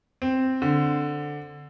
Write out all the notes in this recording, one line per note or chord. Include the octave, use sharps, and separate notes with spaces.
C4
D3